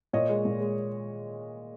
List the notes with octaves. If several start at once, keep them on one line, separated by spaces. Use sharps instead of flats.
A#2 C#5 D#5
G#3
A#2
G#3